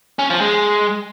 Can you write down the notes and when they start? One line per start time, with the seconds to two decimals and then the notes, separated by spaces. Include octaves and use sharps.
0.19 C#4
0.30 F3
0.41 G#3